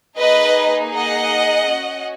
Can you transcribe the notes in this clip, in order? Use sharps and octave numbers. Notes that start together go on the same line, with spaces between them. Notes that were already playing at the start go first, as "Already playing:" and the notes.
A#3 D#4 G#4 B4 D#5
D#5 F#5
C#4 F#4